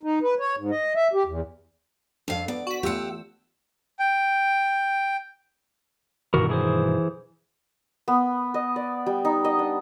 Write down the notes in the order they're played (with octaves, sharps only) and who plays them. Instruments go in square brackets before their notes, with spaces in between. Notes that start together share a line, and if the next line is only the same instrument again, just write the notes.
[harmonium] D#4
B4
C#5
G#2
D#5
E5
G4
E2
[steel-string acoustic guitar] F2 F5 [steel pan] D4 A4
[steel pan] B3 [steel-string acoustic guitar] D5
[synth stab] F#4 B6
[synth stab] E2 E6 [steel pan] A3 F4 [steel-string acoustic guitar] G4 F#5
[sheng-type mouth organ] G5
[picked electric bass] G2 B2 D#3 [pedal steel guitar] E3 F#4 A#4
[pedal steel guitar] E3 G#4 C5
[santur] B3
D#5
D5
G3
D#4
D#5
D4